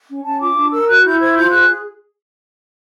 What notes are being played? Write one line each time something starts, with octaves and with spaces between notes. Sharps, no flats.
C#4
C#4 A5
F4 D6
D4
A#4 E6
F#4 F#6
E4 G6
C5 G#6
F4 G6
G#4 F#6